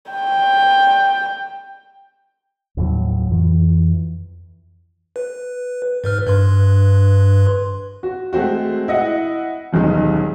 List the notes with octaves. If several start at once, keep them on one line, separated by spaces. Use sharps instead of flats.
G5
D#2 A2 F3 F#3
F2 E3
B4
G#2 B4 F6
G2 B4 C6
F#4
G#3 A3 C4 F#4
E4 D#5 F#5
D#1 B1 G#3 D#4